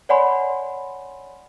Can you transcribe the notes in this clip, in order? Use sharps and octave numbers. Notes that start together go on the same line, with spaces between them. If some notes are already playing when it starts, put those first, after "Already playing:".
C#5 D5 F#5 G#5 B5 C6